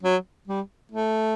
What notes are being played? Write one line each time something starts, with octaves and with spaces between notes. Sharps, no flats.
F#3
G3
A3